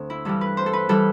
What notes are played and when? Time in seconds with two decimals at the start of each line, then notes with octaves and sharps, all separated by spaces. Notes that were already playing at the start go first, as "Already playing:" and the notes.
Already playing: D2 C4
0.10 E4
0.25 G2 E3 G3 A4
0.41 B4
0.57 C5
0.66 A4
0.73 B4
0.89 E3 G3 A4